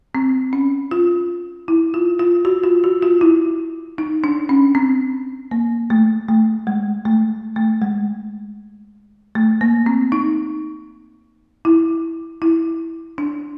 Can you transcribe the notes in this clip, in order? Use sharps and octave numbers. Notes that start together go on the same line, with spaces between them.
C4
C#4
F4
E4
F4
F4
F#4
F4
F#4
F4
E4
D#4
D4
C#4
C4
A#3
A3
A3
G#3
A3
A3
G#3
A3
A#3
C4
D#4
E4
E4
D4